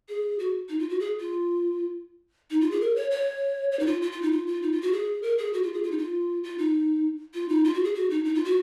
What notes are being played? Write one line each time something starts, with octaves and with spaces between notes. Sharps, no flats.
G#4
F#4
D#4
F4
F#4
G#4
F4
D#4
F4
G#4
A#4
C#5
C#5
C#5
D#4
F4
F4
F4
D#4
F4
F4
D#4
F4
F#4
G#4
A#4
G#4
F#4
F4
G#4
F4
D#4
F4
F4
D#4
F4
D#4
F4
F#4
G#4
F#4
D#4
D#4
F4
F#4